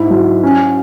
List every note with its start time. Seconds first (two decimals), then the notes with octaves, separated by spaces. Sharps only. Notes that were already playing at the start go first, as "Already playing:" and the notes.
Already playing: G#2 E4
0.10 F#3
0.43 C#4